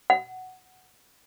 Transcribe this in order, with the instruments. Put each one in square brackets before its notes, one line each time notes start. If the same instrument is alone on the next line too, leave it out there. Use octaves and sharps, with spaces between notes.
[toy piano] F#5